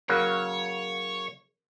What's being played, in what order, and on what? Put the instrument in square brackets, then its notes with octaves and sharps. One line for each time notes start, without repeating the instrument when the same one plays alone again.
[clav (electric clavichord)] C#3 F#3 A#3 [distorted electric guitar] C#5